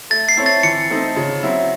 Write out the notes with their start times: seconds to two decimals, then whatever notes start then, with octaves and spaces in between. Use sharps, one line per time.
0.10 A3 A6
0.29 C7
0.37 C4 E4 A4 C#5
0.46 A6
0.63 E3 C#7
0.90 A3 C4 D#4 A4
1.16 C#3
1.43 F#3 C4 E4